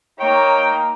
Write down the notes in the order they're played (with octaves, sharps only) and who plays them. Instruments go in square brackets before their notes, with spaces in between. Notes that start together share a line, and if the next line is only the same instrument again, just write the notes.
[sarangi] A#3 [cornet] D#4 [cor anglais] C#5 [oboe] G5